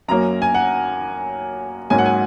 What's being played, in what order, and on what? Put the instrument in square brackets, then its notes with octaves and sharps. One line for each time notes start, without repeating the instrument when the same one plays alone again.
[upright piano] F#2 F#3 A#3 C#4 A#5
G#5
F#5
G#2 F#3 A#3 C#4 G#5
F#5
G#5